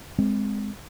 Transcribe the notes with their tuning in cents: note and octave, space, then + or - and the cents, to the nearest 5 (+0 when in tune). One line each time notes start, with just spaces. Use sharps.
G#3 +0 C4 -15